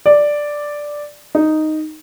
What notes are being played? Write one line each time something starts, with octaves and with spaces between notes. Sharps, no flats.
D5
D#4